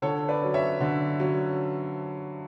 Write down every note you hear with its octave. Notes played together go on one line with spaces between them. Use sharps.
D3 A4 C#5
B4 D5
F#3 C#4
C#5 E5
D3
F#3 C#4